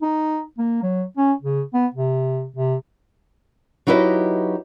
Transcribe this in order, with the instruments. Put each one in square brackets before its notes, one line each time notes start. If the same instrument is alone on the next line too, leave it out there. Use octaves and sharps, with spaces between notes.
[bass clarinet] D#4
A#3
F#3
C#4
C#3
B3
C3
C3
[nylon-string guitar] F#3 D#4 E4 G4 B4 D#5